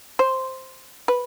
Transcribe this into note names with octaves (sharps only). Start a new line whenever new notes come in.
C5
B4